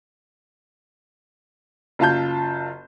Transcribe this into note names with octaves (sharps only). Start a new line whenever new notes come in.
F#1 F4 A5 G6